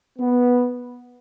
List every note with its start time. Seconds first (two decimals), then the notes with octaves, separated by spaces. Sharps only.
0.19 B3